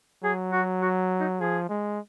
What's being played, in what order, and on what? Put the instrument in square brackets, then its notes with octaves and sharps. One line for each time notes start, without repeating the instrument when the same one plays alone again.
[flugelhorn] F#3 [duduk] G#4
[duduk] F#4
F#4
D#4
[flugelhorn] F3 [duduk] G#4
[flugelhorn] G#3